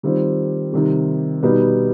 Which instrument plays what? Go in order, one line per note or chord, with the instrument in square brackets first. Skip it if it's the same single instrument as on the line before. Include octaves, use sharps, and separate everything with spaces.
[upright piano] D#3 G3 C4 F4
C3 D#3 G3
B2 G3 B3 D#4